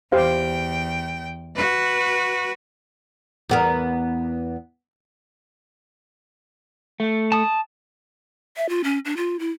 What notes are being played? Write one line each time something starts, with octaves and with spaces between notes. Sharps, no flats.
E2 G4 C5 F5 G5
F#4 B4
E2 B3 A#4
A3
A5 D#6
E5
F4
C#4
D4
F4
E4